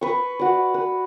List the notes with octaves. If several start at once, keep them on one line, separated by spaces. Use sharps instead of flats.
B4 C#6
F#4 D5
B4